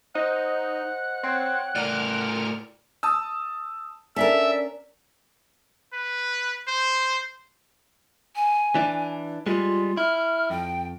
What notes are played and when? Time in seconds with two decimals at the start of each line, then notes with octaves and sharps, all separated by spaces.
0.15 D#4 C5 D#5 F#5
1.23 C4 C#5 G5 G#6
1.75 A2 A#4 D5 F6
3.03 A5 D#6 E6
4.16 C#4 D4 A4 A#4 D5 E5
5.93 B4
6.68 C5
8.36 G#5
8.75 E3 D4
9.46 G3 G#3 F4
9.97 E4 F6
10.50 F2 G5